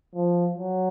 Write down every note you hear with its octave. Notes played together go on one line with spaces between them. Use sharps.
F3
F#3